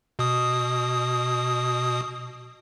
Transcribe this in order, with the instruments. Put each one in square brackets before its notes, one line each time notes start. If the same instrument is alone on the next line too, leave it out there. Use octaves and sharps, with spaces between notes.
[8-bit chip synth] B2 D#6